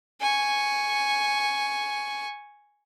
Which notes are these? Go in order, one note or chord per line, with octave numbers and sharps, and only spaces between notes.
G#5 C#6